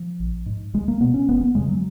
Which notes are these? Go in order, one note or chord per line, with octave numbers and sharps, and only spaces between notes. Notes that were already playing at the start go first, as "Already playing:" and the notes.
Already playing: F3
A#1
G#2
C#2 G#3
A#3
B2 B3
C#4
F#1 B3
B3
F2 C#3 G#3
F#3